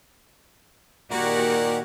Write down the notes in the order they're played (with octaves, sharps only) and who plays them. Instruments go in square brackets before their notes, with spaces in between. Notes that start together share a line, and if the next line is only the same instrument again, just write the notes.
[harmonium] A#2 D#3 [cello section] A#3 F#4 G4 [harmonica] A#4 D5 F#5